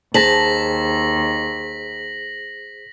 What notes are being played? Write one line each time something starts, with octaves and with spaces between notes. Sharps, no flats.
D#2 G#4 C5 A5 A#6 B6 F#7